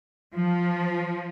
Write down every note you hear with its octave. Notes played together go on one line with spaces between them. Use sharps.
F3